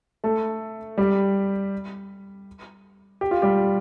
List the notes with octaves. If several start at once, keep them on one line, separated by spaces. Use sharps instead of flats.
A3 A4
G3 G4
G4
F4
G3 G4